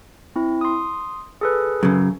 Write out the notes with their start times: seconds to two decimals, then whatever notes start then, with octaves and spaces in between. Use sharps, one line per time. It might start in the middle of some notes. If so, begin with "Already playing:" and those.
0.36 C4 E4
0.61 C6 D#6
1.41 G#4 A4 B4
1.83 F#2 C#3